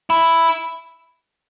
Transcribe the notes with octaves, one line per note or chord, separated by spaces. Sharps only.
E4